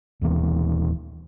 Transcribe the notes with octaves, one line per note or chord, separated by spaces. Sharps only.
D#1 D#2 E3 B3